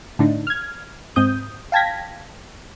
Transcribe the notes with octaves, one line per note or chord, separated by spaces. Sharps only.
A2 D3 D4 D#4
F6 G#6
G#2 C4 D#6 G6
F5 G5 A5 G#6 A#6 B6